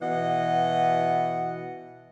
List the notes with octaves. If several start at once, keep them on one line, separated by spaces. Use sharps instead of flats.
B2 E3 D#5 F#5